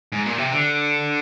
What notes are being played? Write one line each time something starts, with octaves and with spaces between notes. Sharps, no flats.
G#2
A#2
C3
D3